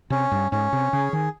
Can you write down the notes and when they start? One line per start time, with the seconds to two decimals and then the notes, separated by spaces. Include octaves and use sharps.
0.10 C3 C#4
0.32 G2
0.52 G#2 C#4
0.73 C3
0.93 C#3 G#4
1.13 D#3